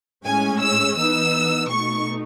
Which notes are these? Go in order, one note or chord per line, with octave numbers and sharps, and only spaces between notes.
A2 G#3 C#4 G#5
E6
E3 B3 D#4 E6
B2 A3 D#4 C#6